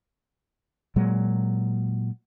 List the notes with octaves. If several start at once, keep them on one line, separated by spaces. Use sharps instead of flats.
A#2 F#3 G#3